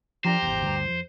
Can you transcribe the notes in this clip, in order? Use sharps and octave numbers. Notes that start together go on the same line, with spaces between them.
F3 D4 G4 C5 A#5
G#1 E2
D2 G2
F2